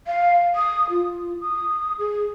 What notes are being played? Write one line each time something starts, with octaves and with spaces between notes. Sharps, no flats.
F5
D#6
F4
D#6
G#4